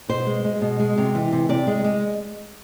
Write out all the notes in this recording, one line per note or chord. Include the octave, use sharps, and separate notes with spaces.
B2 C5
G#3
G#3
B2
G#3
C3
E3
C3
C3 D5
G#3
G#3